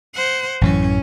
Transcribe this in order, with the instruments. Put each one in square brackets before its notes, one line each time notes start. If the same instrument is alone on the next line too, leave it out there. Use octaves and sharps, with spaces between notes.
[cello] C5 F#5
[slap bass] A1 F#2 E3 [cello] C#4